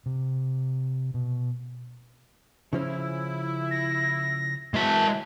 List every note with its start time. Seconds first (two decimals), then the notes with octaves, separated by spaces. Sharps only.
0.06 C3
1.14 B2
2.73 C#3 F3 C#4 E4
3.71 A#6
4.74 E3 F#3 G#3 E5 A5